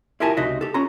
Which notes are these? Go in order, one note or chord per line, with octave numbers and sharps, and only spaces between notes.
E4 F4 G4 A#4 G#5 A5
C#2 C3 D#4 F#4 D#5 E5
G4 A4
C#4 F4 A#5